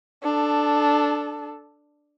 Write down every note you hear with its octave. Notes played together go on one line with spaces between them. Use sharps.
D4 A4